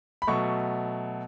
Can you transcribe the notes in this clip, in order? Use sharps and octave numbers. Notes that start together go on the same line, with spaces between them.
B5
B2 F#3 A3 C#6